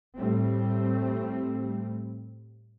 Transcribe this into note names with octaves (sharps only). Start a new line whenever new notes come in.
A2 G3 A3 C4